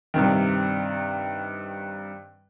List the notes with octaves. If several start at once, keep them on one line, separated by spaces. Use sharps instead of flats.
G2 C3 D#3